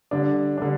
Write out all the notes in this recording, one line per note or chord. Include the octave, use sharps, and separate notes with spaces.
D3 G3 D4
D3 G3 D4